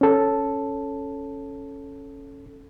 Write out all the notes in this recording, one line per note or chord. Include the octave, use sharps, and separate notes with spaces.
C#4 A4